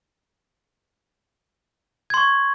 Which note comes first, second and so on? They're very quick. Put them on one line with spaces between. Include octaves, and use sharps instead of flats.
G#6 C6 C#6